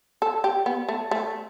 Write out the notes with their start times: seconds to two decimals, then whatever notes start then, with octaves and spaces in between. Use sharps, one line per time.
0.22 A4
0.44 G4
0.66 B3
0.88 A3
1.11 A3